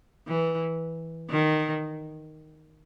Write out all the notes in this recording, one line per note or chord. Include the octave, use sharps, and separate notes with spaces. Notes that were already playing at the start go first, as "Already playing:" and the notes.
E3
D#3